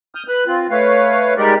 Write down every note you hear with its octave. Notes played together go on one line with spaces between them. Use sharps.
D#6 F6 G6
B4 F#6
C4 F4
A3 B4 C#5 F5
G3 G#3 D#4 G4 A#4 D5